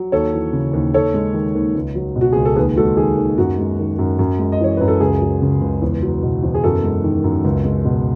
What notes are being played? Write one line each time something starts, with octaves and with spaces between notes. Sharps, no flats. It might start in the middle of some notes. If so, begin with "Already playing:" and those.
Already playing: F#3
D#2 A4 C#5
E3
C#3
D#2
D#2 A4 C#5
G#3
D#3
D#2
C#2
F#3
B2
F#4
C#2 G#4
A4
D#2 G#4 B4
G#3 F#4 A4
D#3 G#4
D#2
F#2 F#4
G#3
D#3
F#2
F#2
G#3
D#5
E3 C#5
F#2 B4
A4
C#2 G#4
F#3
C#3
C#2
E2
F#3
B2
E2
G#4
F#2 F#4 A4
G#3
D#3
F#2
C#2
G#3
B2